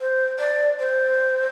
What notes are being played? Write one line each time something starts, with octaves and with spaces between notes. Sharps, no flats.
C5
D5
C5